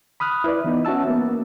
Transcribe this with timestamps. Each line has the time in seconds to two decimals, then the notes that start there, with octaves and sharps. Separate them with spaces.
0.20 B5 D#6 F6 F#6
0.44 E4 B4 D5
0.64 E3 B3 D#4
0.85 C#4 F#4 E5 A5 E6
1.07 A#3 B3